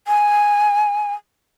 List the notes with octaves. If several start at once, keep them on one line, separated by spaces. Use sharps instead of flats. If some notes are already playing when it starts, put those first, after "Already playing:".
G#5